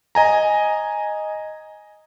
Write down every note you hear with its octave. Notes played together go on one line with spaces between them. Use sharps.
D#5 G#5 A#5